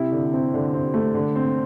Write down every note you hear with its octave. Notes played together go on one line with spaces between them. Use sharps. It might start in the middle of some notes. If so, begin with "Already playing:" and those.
Already playing: C3 E4
D3
C4
D3
C4
A3
D3
C4